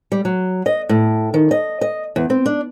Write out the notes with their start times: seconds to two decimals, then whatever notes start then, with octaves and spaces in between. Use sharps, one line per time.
0.12 G3
0.25 F#3
0.66 D#5
0.89 A2
1.34 D#3
1.51 D#5
1.81 D#5
2.16 E2
2.30 C4
2.46 D4